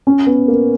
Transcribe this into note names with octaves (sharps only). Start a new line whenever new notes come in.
C#4
B3
A#3